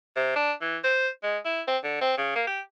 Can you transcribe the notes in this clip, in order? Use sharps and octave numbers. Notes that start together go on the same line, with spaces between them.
C3
D4
E3
C5
G#3
E4
C4
D3
C4
C#3
A#3
G4